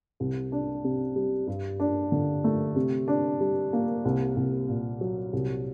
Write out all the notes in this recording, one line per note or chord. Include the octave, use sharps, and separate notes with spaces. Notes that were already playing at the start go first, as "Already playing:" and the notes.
C2
D4
C3
G3
G2
D4
D3
A3
C3
D4
G3
A#3
C2
C2
A#2
F#3
C2